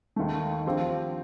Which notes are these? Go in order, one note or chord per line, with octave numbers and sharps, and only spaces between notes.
D#2 D#3 A3
D3 F3 C4 G4